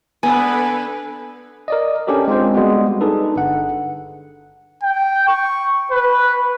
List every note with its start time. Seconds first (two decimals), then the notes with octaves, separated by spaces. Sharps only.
0.23 D3 B3 B4 G#5
1.68 A#4 D5 D#5
2.07 C#4 D4 G4 A4 A#4
2.28 G#3 C4 F4 C5
2.54 G3 G#3 B3 F#4
3.01 D4 D#4 G#4 A4 B4
3.36 G1 F#5
4.83 G5
5.28 C#6
5.92 B4